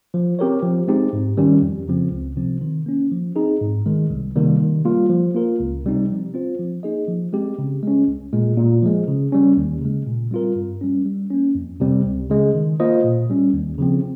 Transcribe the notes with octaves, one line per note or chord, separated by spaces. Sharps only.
F3
C4 G4 A#4 C#5
F3
G#3 C4 D#4 G4
G#2
D#3 G3 C#4 G4
F2
C#3 F3 C4
C#2
C3 F3 C4
D#3
A#3 C#4
F3
C4 D#4 G#4
G#2
D#3 G#3
C2
C3 D#3 G3 A#3
D#3
G3 A#3 F4
F3
A#3 F4 A#4
C#2
C3 G3 C4 D#4
F3
C4 F4 C5
F3
A#3 D#4 G#4 D#5
F3
G#3 C4 G4
C#3
G#3 C#4
C2
A#2 G#3
A#2
F3 G#3
C#3
G3 C#4
D#2
C#3 G#3
A#2
G3 C4 F4 A#4
G2
G3 C#4
G3
A#3 C#4
F2
C3 G3 C4
C#2
C#3 G#3
D#3
A#3 F4 C5 D#5
A#2
G3 C#4
D#2
C#3 F3 C4